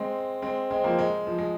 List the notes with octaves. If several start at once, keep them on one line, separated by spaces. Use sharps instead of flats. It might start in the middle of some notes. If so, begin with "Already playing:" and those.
Already playing: G#3 C4
G#3 C4
G#3 C4
F3 A#3
G#3
F3
G#3